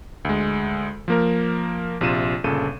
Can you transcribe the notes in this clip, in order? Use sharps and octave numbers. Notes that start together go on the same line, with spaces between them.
D2 G#3
F3 A#3 A#4
A#1 C3 F4 D#7 E7
G1 A#2 C#3 A4 D#7